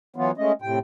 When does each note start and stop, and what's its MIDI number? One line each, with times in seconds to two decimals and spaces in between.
0.16 0.31 52
0.16 0.31 54
0.16 0.31 59
0.16 0.31 65
0.38 0.52 56
0.38 0.52 57
0.38 0.52 61
0.38 0.52 75
0.62 0.79 45
0.62 0.79 48
0.62 0.79 79